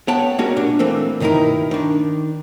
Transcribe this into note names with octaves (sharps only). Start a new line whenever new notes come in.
B3 C#5 F#5 G5 A5
G3 G#3 A#3 C#4 F#4
A#2 D4
E3 A3 A#3 C4
B1 G2 D#3 D#4 E4 A#4
D#3 D4